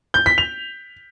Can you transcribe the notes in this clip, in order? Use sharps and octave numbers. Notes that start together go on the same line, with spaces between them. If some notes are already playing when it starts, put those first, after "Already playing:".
G6
B6
F7